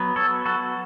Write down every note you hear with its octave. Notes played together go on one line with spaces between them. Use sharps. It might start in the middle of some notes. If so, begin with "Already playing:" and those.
Already playing: F#3 B3
A4 C#5
F#4 A4